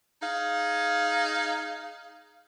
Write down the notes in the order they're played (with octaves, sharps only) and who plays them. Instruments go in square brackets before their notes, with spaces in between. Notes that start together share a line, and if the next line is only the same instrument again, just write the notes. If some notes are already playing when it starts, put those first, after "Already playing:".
[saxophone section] D#4 G#4 F5